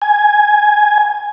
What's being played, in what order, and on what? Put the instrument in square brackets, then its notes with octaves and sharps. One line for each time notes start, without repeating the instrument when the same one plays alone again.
[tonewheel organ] G#5